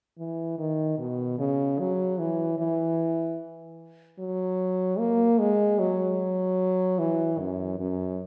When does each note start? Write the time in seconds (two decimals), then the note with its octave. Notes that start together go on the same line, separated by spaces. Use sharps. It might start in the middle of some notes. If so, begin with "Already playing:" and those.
0.19 E3
0.58 D#3
0.99 B2
1.39 C#3
1.79 F#3
2.19 E3
2.59 E3
4.19 F#3
4.99 A#3
5.39 G#3
5.79 F#3
6.99 E3
7.39 F#2
7.80 F#2